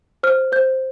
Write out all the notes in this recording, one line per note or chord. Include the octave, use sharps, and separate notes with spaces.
C5 F6
C5 G6